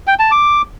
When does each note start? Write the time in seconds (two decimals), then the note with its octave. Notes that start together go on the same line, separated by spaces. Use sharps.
0.07 G5
0.19 A5
0.31 D6